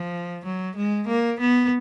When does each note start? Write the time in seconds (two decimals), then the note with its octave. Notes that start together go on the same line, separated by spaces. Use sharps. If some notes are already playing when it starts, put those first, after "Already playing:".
Already playing: F3
0.45 F#3
0.76 G#3
1.08 A#3
1.40 B3